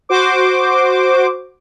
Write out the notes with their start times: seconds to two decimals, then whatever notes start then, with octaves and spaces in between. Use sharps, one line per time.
0.09 F#4 C5 D6